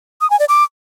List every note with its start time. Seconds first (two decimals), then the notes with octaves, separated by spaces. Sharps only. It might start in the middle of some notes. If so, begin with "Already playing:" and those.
0.21 D#6
0.30 G#5
0.39 D5
0.49 D6